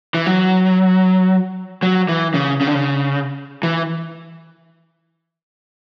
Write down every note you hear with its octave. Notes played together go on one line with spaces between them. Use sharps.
E3
F#3
F#3
E3
C#3
C#3
D3
C#3
E3